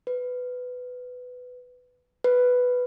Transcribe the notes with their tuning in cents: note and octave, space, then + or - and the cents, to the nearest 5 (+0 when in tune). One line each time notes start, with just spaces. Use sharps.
B4 +15
B4 +5